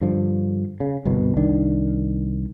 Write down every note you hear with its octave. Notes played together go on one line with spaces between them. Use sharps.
G2 D3 F3
C#3
G1 C2 B2
C2 D#3 D4